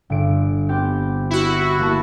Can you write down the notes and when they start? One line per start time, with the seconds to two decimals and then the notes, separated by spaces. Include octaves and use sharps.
0.10 G1 D7
0.68 B3 C4 G4
1.30 E4 F#4
1.79 A#3 A5